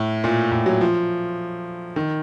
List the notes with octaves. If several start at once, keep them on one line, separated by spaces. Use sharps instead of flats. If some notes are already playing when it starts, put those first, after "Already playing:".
Already playing: A2
A#2
A2
F#3
F3
D#3